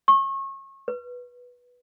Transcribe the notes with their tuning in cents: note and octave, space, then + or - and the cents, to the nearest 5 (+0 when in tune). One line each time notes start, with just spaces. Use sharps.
C#6 -30
B4 -10